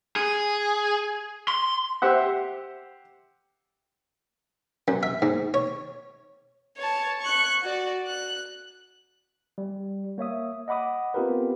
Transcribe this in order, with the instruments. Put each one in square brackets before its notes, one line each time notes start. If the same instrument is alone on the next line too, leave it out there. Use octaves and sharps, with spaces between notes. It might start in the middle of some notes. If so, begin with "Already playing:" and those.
[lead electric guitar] G#4
C6
[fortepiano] G4 C5 E5 F#5
[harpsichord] F#2
E5
G#2
C#5
[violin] C#5 A5
C#6 F#6
F#4 D5
F#6
[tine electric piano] G3
A#3 C#5 E5 D#6
D#5 F#5 B5 D6 D#6
B3 C4 F4 G4 A#4 B4